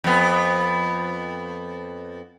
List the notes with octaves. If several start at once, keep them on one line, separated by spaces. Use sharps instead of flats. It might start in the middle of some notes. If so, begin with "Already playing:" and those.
F2 B3